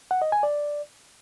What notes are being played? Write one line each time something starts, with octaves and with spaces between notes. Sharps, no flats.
F#5
D#5
G#5
D5